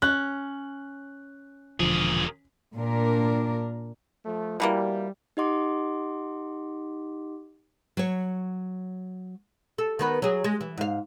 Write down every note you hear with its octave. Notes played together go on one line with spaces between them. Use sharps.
C#4 F#6
E1 A#2 D3 F3 G#4
A#2 D4 A#4
F3 A3
B2 E3 G3 A#3
D#4 G4 D#5 F#5 C6 D6
F#3 C#5
A4
D#3 B3 B4
F#3 G#4
G#3
E3
G#2 F5